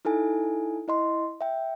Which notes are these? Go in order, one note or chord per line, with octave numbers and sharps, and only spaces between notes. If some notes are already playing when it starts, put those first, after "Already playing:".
D#4 E4 A4 G#5
E4 D#5 C6
E5 G5